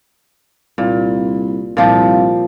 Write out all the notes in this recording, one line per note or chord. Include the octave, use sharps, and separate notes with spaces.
C2 A#2
C2 A#2 F3 G4